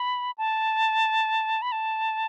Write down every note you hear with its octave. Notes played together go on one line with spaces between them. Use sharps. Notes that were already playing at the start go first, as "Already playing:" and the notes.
Already playing: B5
A5
B5
A5